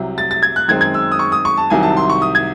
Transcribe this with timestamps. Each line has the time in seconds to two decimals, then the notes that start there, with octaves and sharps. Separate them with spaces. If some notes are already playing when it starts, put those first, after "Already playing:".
Already playing: C2 C3 F#3
0.18 A6
0.31 A6
0.43 G#6
0.56 F#6
0.68 F#2 D#3 G#3 C4 G#6
0.81 G#6
0.94 E6
1.12 D#6
1.19 C#6
1.32 D#6
1.45 C#6
1.57 A5
1.70 C2 C3 D#3 F#3 G#5
1.83 A5
1.97 C6
2.10 C#6
2.22 D#6
2.35 G#6